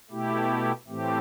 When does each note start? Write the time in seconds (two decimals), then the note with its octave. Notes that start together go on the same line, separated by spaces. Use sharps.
0.11 B2 A3 E4 G4
0.87 A2 E3 A3 C4 G4